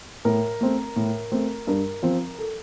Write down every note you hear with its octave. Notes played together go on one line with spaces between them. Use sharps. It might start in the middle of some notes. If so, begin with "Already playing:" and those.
A2 A#4
A3 C4
A2
A3 C4
G2 A#4
F3 C4
A4